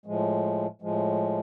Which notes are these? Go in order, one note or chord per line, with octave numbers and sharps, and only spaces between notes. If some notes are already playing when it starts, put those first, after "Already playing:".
A2 F3 G#3
A2 F3 G#3